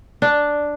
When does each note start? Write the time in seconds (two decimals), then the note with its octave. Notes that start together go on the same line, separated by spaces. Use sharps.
0.22 D4